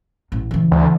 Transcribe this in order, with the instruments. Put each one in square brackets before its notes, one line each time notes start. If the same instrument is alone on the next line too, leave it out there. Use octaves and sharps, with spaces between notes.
[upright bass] A1
C#3 E3
[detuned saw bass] D2